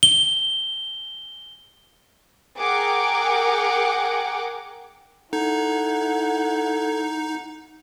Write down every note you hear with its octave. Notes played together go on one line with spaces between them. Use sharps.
G7
G#4 A#4 F#5 G5 D6
D#4 E4 A4 F#5 G#6